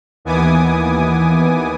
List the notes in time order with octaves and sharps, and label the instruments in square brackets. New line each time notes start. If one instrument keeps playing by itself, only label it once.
[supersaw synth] D#2 E3 B3 G#5 D6 D#6